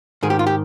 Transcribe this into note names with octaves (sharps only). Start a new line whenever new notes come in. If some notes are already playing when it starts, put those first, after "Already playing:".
G#2 D#3 G#4
G4
F4
G4